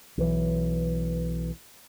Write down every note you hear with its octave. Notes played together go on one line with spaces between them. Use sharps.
B1 E3